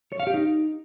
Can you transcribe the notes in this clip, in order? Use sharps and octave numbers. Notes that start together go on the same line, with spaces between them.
C#5
F5
G4
D#4